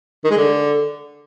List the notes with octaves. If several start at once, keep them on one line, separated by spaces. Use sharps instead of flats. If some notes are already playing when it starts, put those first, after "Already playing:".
D#3
G#3
D3